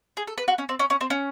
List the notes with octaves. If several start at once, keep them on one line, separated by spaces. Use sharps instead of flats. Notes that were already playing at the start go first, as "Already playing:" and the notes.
G#4
A4
B4
F#4
C#4
C4
C#4
C#4
C4
C#4